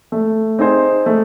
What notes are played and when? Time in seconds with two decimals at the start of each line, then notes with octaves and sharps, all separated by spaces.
0.12 A3
0.59 C4 D#4 G#4 C5
1.06 A3